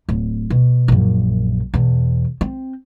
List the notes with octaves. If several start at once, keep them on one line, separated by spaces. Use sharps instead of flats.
D1
B2
A#1 F#2
E2 B2
C4